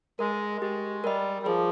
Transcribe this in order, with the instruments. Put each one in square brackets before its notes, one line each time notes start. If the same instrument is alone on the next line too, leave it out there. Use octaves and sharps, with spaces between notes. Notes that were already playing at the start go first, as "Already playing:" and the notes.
[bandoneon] G#3 [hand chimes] A#4 D#5
[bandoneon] G#3 [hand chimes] G4
[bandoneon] G3 [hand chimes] A#4 D#5
[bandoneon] G3
[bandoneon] F3 [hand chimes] G#4